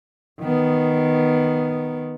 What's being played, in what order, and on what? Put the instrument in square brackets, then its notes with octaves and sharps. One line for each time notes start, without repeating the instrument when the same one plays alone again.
[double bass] D#3 B3